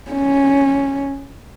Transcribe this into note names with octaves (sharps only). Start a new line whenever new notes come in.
C#4